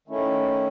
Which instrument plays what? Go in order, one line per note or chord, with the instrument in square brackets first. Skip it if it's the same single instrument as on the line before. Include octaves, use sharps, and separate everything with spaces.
[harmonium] D#3 A3 C#4 E4